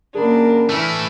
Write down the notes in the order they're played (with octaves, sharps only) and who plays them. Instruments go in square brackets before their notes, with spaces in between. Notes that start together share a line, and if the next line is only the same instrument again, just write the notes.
[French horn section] F#2 C#3 A#4 [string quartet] A#3 D4 [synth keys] G#4 B5
[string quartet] E3 [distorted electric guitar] A3 E4 [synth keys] A5 F6